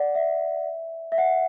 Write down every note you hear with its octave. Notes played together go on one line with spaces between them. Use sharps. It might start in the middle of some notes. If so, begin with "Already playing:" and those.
Already playing: D5 F#5
E5
E5
F#5